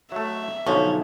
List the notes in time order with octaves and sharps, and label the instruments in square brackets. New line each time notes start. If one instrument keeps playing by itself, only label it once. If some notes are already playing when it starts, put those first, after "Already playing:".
[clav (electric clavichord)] F#3 A3 [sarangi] E5
[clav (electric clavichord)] B1 D3 F3 [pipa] C#4 [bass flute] D#4